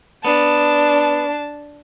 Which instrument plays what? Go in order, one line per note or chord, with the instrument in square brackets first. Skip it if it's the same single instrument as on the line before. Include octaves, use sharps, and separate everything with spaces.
[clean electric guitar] B3 [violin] D4 A5